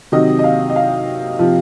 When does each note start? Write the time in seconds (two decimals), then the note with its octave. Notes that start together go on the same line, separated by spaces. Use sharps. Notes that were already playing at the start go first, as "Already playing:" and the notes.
0.12 C3 D#3 F#3 D#5
0.39 D#5
0.44 F5
0.70 D#5
0.76 F5
1.39 C3 F3